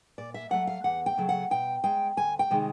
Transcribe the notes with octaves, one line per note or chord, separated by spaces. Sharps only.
A#2 D5
E5
F#3 A3 F#5
F5
E2 F#5
G5
C#3 F#3 A3
F#5
B2 G5
G#3 G5
D2 G#5
G5
C3 D#3 G#3